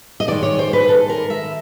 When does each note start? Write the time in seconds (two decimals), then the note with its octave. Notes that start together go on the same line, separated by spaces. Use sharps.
0.20 D#5
0.28 D#3 G#3 D5
0.43 C#5
0.59 C5
0.73 B4
0.89 A4
1.10 A#4
1.30 E5